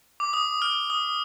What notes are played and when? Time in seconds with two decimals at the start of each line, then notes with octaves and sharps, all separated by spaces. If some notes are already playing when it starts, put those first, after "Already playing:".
0.20 D6
0.33 D#6
0.62 F6
0.90 D#6